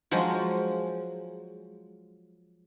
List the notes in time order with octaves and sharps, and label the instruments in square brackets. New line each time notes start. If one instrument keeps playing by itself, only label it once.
[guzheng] F3 F#3 G#3